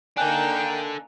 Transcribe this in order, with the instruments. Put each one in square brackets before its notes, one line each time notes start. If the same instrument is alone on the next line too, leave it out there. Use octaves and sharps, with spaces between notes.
[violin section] A#3 D#4 [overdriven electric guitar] D4 A4 [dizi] G5 [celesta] G#5 F#6